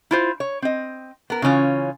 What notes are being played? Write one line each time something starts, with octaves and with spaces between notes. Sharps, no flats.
E4 F4 C5
C#5
C4 D#5
B3 A#4
C#3 E3 C#4 F4